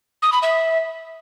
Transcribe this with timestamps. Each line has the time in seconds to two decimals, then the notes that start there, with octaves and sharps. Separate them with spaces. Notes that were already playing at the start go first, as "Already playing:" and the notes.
0.22 D#6
0.32 B5
0.42 E5